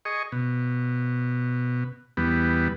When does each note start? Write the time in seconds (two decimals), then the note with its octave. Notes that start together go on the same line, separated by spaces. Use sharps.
0.05 G#4 D#5 C#6
0.32 B2
2.17 E2 G3 B3